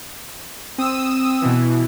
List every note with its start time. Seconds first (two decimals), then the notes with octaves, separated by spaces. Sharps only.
0.78 C4 D#6 E6
1.41 B2 E3